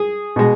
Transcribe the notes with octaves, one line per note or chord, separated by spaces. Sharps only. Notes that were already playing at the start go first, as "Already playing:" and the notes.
Already playing: G#4
B2 G#3